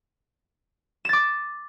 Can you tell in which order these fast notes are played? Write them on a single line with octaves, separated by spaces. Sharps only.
E7 A6 D6